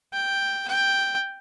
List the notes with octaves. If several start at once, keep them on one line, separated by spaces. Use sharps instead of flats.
G5
G5